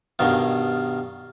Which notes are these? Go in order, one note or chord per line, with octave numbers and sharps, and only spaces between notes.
G2 B2 D#3 F4